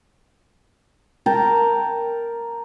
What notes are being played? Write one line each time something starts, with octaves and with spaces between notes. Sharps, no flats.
A#4 G5 A5 A#5